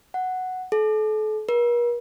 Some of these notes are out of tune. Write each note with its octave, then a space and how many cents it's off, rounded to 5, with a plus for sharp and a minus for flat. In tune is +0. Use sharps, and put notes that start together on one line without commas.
F#5 +0
A4 -40
A#4 +45